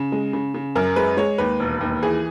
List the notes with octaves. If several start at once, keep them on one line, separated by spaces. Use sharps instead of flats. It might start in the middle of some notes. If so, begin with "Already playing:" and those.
Already playing: C#3
G#3
C#3
C#3
F#2 A#4
G#3 B4
G#3 C#5
D#2 B4
E1
D#2
E3 G#4